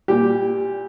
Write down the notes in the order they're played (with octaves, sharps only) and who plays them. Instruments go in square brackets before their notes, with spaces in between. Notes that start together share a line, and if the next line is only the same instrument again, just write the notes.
[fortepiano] A#2 G3 G4